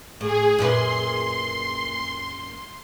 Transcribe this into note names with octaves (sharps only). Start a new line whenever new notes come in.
A2 G#4
F#2 A#2 B4 C6